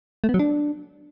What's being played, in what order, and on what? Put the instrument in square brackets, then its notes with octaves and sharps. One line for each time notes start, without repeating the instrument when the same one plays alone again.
[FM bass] A3
B3
F#3
D4